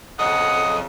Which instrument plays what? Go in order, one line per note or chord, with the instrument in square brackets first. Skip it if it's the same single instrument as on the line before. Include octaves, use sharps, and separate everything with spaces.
[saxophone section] F2 C#3 [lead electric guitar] A4 D#5 [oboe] F#5 [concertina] D#6